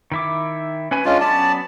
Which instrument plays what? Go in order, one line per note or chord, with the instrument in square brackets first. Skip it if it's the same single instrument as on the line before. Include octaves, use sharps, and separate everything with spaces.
[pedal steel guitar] D#3 E4 D6
C#4 B4 G#5
[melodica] G#3 C#4 F4 [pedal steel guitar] D4
[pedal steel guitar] F#3 B3 C#4 [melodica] D5 A5